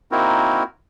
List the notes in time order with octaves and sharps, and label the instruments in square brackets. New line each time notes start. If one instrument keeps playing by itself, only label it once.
[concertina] A#3 C4 D#4 E4 F#4 A#4